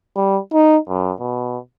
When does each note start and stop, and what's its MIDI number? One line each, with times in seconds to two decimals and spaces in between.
0.16 0.39 55
0.53 0.78 63
0.88 1.12 42
1.20 1.58 47